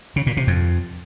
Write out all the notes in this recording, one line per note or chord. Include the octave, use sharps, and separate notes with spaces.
C#3
A#2
C3
F2